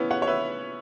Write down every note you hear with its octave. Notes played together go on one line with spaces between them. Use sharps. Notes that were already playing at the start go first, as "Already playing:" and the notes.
Already playing: B3 C#4 E4
C#5 F#5
C#5
B4 E5